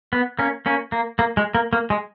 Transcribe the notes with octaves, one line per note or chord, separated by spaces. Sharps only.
B3
A#3 C#4
A#3 C#4
A#3
A#3
G#3
A#3
A#3
G#3